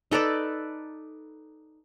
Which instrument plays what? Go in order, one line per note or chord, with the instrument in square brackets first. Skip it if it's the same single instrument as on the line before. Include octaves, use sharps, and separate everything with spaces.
[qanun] D#4 A4 B4 D5